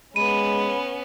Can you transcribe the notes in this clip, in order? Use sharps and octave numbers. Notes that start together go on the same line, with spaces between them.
G#3 B3 C#4 B5 D#7